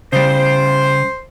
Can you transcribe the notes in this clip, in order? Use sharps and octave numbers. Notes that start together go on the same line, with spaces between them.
C#3 G3 C5